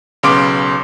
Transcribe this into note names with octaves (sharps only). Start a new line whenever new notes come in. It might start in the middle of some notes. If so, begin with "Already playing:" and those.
B1 C#3 B3 C6 D6 D7